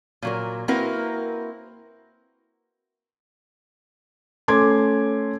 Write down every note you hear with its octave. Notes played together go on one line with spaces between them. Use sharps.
A#2 F#3 A#4
A#3 C4 E4 F#4 A#4 B4
A3 C#4 C6 D6 G#6